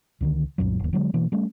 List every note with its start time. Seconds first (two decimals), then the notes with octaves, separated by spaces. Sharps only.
0.21 C#2 D3 D#3
0.58 C2 F#2 A#2 F#3
0.80 F#1 D#2
0.93 D3 F#3 G#3
1.14 B2 E3 A#3
1.32 G3 A3 C#4